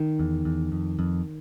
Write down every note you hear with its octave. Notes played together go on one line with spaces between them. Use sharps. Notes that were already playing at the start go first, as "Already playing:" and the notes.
Already playing: D#3
E2
E2
F2
F2